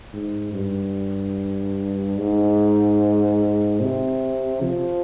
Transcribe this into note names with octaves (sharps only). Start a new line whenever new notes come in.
G#2
G2
G#2
C3
F3